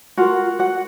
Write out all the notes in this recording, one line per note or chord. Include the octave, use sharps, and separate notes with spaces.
F4 F#4 A#4 F#5
F#4 F#5